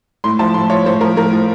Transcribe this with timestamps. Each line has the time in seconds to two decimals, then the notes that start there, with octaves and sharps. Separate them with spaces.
0.24 A2 C6
0.39 F3 A5
0.54 A2 C6
0.70 F3 C#5
0.85 A2 C5
1.01 F3 A#4
1.16 A2 A#4
1.33 F3